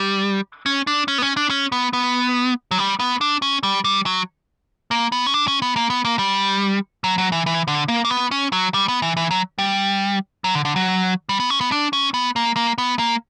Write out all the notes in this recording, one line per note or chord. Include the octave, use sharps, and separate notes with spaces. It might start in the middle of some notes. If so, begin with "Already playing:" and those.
Already playing: G3
C#4
D4
C#4
B3
C#4
D4
C#4
B3
B3
F#3
G3
B3
D4
C#4
G3
G3
F#3
A#3
B3
C#4
D4
C#4
B3
A#3
B3
A#3
G3
F#3
F#3
E3
E3
D3
A#3
A#3
B3
C#4
F#3
G3
B3
E3
E3
F#3
G3
F#3
D3
D3
F#3
G3
B3
C#4
B3
D4
C#4
B3
A#3
A#3
B3
A#3